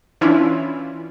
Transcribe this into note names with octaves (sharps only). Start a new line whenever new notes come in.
E3 C#4 D4 E4 F4